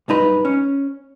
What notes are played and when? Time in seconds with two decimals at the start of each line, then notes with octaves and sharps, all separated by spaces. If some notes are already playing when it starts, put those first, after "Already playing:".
0.08 B1 G2 D#4 B4
0.45 C#4